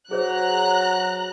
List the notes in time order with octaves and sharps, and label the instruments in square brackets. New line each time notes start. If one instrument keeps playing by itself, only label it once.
[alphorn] F#3 [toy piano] G#4 C5 C#5 [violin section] A#5 F#6